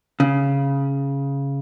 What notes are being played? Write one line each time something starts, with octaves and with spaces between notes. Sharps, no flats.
C#3